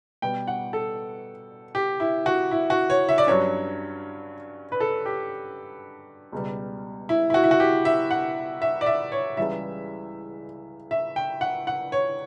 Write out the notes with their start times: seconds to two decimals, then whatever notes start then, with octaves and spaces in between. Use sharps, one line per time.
0.22 B2 G3 B3 G5
0.47 F#5
0.73 A4
1.75 G4
2.00 E4
2.26 F#4
2.51 E4
2.70 F#4
2.90 C#5
3.09 E5
3.18 D5
3.27 G2 F#3 C#4 C#5
4.72 B4
4.80 A4
5.06 G4
6.32 C#2 B2 G3
7.09 E4
7.30 E4
7.34 F#4
7.44 E4
7.51 F#4
7.60 G4
7.85 E5
8.11 F#5
8.62 E5
8.81 D5
8.86 E5
9.12 C#5
9.37 C#2 C#3 E3 G3 E5
10.91 E5
11.16 G5
11.41 F#5
11.67 F#5
11.92 C#5